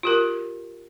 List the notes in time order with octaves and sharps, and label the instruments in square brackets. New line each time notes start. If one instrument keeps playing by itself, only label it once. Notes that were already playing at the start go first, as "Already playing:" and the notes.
[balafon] F4 G4 A#4